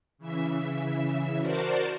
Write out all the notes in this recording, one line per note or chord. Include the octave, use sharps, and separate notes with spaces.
C#3 E3 E5
F#4 A#4 C5 D5 A5